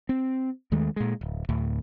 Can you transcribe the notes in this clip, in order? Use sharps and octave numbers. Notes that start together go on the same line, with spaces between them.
C4
D#2 D#3 G#3 A3
A#2 G#3
D1
D2 A2